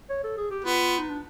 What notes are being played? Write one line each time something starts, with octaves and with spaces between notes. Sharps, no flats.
C#5
A4
G#4
G4
B3 F4
D#4
D4